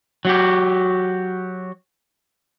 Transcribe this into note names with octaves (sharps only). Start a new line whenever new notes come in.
F#3 F#4 G4